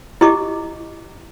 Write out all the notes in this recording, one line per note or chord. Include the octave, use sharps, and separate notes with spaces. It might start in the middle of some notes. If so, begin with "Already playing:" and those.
E4 G4 D#5 D6